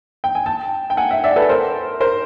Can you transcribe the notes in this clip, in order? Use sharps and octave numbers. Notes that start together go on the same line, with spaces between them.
G5
G#5
G5 A5
G5
F#5 G#5
E5 F#5
D5 E5
A4 B4
A#4 C5
A#4 C5